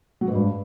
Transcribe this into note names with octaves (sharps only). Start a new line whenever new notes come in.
F#3
G#2
G2